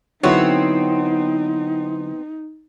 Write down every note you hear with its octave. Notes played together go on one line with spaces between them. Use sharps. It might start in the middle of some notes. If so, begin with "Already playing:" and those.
D3 F#3 B3 C4 D#4 E4 C#5